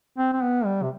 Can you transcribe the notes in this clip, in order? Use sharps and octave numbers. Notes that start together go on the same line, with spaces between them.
C4
C4
B3
G3
C3